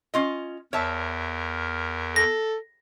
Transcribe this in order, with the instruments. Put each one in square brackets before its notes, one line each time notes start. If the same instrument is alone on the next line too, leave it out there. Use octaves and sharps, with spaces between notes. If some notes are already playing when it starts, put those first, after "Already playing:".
[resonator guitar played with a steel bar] C#4 F4 D#5
[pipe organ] E2 A#4 [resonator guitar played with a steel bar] C#5 E5 A5
[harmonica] A4 [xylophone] A#6